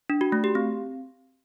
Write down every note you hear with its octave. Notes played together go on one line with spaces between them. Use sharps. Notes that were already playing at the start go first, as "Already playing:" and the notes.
D4
F#4
A3
G4
C4